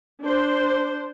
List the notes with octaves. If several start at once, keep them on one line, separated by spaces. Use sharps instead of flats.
D4 C5